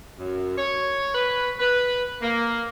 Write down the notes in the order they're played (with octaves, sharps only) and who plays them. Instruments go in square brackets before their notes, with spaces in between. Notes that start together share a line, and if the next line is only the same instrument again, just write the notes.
[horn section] F#2
C#5
B4
B4
A#3